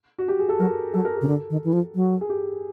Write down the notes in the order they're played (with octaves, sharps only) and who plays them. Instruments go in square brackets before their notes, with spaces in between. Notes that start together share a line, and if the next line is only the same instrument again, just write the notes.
[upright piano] F#4
G4
G#4
A4
[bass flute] F#3 [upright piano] A#4
[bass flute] F#3 [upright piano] A4
[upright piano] A#4
[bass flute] C#3 [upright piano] A4
[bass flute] D3
D#3
E3
F3
F#3
[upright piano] G#4
G4